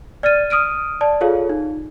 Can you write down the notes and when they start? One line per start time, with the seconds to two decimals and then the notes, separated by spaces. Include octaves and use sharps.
0.23 D5 F6 A6 D#7
0.50 D#6 F6 D7 D#7
1.01 D5 A5
1.21 F4 G#4 A4 C#5 F5
1.49 D#4